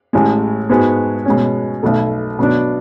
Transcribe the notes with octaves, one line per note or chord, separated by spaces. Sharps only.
A1 A2 G#3
G#2 G#3 B3 F#4
B2 G#3 C#4
B1 B2 A3
B2 F#3 B3 D4